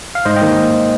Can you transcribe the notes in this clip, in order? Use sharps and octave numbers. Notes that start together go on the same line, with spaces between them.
F5
G#2 C5 D#5
D#5 G5
D#3 A#3 D#4